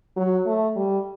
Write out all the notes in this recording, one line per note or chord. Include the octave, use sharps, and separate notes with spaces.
F#3
A3
G3